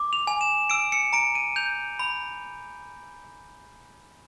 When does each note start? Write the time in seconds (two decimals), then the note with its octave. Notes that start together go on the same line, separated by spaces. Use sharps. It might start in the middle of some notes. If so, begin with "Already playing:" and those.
Already playing: D6
0.13 F7
0.27 G#5
0.41 E7
0.70 E6 D7
0.92 C#7
1.13 A#5 D7
1.35 D#7
1.56 G6 F7
1.99 B5